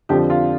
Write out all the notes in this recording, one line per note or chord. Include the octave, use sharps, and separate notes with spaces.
F2 D3 F3 G4
F4